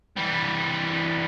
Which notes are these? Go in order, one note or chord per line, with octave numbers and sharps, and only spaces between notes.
E3 G3